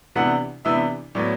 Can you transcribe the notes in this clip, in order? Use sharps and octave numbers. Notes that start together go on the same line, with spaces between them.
C3 E3 B3 D4 F#5
C3 E3 B3 D4 E5
A2 F#3 B3 D5